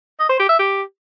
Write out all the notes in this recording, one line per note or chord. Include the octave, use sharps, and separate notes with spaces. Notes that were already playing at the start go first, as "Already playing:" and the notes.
D#5
C5
G4
E5
G4